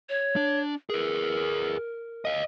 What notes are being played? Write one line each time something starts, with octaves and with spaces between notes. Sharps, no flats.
C#5
D4
G#4 A#4 B4
D#5 F5